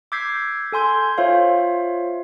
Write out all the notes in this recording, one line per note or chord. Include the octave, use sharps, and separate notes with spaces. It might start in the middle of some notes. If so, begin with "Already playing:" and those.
D6 E6 G6 G#6 B6 C7
A4 G#5 C6 G6 G#6
F4 C5 C#5 E5 F5